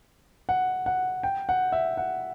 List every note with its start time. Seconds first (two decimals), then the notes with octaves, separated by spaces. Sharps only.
0.49 F#5
0.86 F#5
1.23 G5
1.49 F#5
1.72 E5
1.97 F#5